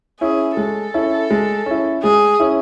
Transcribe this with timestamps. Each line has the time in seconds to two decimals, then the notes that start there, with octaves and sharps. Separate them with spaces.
0.21 C#4 E4 G#4
0.57 G#3 A4
0.94 C#4 E4
1.31 G#3
1.66 C#4 E4
2.03 G#3 G#4
2.40 C#4 E4